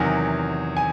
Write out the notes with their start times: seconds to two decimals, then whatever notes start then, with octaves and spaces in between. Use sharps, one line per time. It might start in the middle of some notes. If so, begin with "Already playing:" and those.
Already playing: E2 C3 D#3 F#3 G#5
0.77 G#5